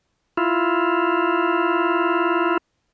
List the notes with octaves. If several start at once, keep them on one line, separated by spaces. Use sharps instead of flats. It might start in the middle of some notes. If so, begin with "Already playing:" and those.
E4 F4